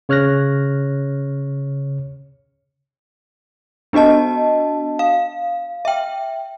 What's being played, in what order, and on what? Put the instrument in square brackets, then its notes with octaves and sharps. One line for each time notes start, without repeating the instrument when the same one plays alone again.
[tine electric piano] C#3 C#5 F6 F#6 A#6
[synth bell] B3 D4 F#4 D#5 A5
F5
E5 G5